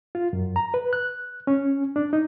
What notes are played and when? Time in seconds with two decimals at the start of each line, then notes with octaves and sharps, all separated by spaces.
0.15 F4
0.33 F#2
0.56 A#5
0.74 B4
0.93 F#6
1.47 C#4
1.96 D4
2.13 D#4